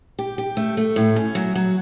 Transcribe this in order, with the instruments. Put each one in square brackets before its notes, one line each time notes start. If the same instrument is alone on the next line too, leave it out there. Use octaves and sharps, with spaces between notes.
[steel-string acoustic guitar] G4
G4
A3
A3
A2
C#4
F#3
F#3